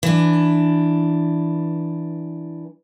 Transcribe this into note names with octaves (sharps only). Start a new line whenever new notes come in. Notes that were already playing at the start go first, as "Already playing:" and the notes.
E3 D4